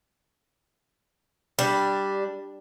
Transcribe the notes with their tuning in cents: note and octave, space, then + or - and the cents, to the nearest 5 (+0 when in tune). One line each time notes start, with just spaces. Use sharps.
G3 +0 D4 +0